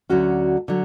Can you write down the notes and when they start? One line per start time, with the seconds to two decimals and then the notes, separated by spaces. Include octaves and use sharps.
0.09 D2 D3 F#3 C#4 F#4
0.68 D3 F#3